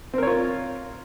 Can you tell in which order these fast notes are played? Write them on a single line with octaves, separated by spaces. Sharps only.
C4 A#4 C#5 F4